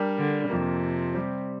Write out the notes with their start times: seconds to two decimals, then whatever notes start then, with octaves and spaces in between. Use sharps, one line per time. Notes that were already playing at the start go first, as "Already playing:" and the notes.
Already playing: G3 D4 A#4
0.18 D3
0.50 F2 C3 F3 A#3
1.14 G3 C4 G4